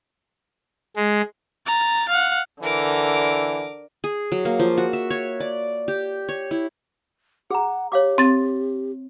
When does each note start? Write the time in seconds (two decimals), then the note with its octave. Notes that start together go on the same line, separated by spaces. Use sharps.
0.96 G#3
1.67 A#5 A6
2.09 F5 F#5
2.63 D3 E3 A#4 D6
4.04 G#4
4.32 F#3
4.45 A#3
4.59 F3
4.78 F#4
4.93 E5
5.10 C#5
5.40 D5
5.88 G4
6.29 C#5
6.51 E4
7.51 G#4 F#5 A#5
7.92 G4 C#5 F5 D6
8.18 C4 A6